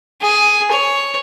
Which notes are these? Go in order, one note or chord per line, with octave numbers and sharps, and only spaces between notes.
G#4
C#5